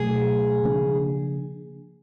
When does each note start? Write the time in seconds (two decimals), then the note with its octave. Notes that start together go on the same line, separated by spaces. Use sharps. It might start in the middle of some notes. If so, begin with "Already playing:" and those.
Already playing: B2 F#3 A3 G#4
0.63 C#3 F3 A#3 D4